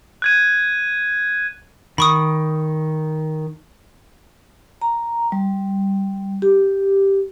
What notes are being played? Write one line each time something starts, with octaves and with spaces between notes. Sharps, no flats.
F#6 G#6 D#7
D#3 B5 C#6 D#6
A#5
G3
G4